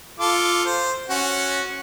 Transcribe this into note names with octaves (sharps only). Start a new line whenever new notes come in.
F4 A4 D6
C5
C#4 F#4